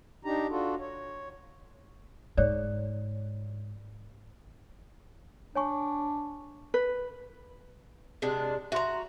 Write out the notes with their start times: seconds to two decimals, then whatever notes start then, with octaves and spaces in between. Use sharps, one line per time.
0.25 D4 D#4 G4 A#5
0.50 D4 F4 F#4 A4
0.80 C#5
2.37 G#2 C#5 D5
5.55 D4 C#5 G#5 C#6
6.74 B4
8.22 C3 G#3 D4
8.72 F#4 E5 A#5 C6